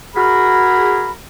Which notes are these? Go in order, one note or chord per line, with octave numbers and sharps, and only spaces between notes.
F#4 G#4 A#4 B5